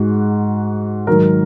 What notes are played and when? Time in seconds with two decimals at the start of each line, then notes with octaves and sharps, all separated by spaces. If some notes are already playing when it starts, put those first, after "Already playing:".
Already playing: G#2 G#3 F#4
1.07 G#2 D#3 F#3 A#4